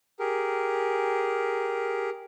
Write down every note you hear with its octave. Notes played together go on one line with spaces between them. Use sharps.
G4 G#4 A#4